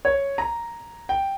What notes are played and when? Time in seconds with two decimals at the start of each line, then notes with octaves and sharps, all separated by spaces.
0.05 C#5
0.38 A#5
1.09 G5